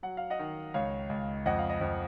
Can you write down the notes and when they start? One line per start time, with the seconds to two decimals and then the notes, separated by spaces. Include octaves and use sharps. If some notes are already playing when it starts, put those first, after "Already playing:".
0.03 F#3 F#5
0.17 F5
0.30 D#5 F#5
0.39 D#3
0.74 C#2 C#5 F5
1.09 C#2
1.46 F2 D#5 F#5
1.58 F5
1.69 D#5
1.81 F2